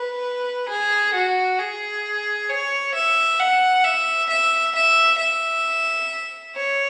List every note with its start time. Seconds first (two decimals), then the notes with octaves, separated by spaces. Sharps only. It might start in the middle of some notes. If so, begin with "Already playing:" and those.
Already playing: B4
0.69 G#4
1.14 F#4
1.59 G#4
2.49 C#5
2.95 E5
3.39 F#5
3.84 E5
4.30 E5
4.75 E5
5.19 E5
6.55 C#5